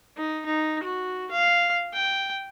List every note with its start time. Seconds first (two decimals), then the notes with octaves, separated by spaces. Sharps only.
0.17 D#4
0.46 D#4
0.84 F#4
1.31 F5
1.94 G5